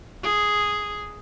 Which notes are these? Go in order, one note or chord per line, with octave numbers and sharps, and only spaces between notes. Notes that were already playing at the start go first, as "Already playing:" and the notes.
G#4